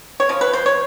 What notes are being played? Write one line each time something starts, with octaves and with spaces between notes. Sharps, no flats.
C#5
C#3 F3
B4
C5
C#5